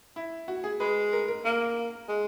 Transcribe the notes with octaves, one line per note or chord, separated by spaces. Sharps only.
E4
F#4
G#4
G#3 B4
A#4
A#4
A#3
G#3